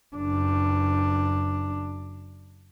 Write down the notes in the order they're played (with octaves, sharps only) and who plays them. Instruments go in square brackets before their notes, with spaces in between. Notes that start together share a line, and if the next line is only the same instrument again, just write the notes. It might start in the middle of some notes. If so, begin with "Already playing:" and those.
[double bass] F#1 D4